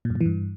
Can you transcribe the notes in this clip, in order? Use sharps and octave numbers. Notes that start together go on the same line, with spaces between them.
A#2
F#2
A#2
E3
G2